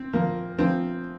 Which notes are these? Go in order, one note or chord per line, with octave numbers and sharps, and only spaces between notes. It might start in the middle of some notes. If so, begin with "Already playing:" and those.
Already playing: C4
F3 A#3
F3 C4